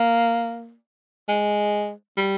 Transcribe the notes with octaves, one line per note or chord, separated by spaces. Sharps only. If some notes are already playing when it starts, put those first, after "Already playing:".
Already playing: A#3
G#3
G3